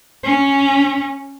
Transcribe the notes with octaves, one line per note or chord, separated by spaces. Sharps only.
C#4